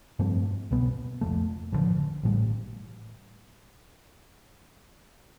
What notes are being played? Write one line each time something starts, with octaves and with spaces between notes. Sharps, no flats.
G2 F3 A3 C4
C2 B2 B3
F1 F2 D3 A3
A1 G2 D3 F3
A1 A2 G3